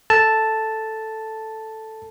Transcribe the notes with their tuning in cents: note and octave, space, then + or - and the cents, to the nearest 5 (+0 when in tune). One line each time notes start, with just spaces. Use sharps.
A4 +0 A5 +0